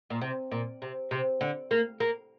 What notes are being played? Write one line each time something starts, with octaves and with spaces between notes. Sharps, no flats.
A#2
C3
A#2
C3
C3
D3
A#3
A#3